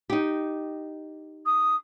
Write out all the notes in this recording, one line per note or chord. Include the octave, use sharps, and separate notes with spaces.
D#4 G4
D#6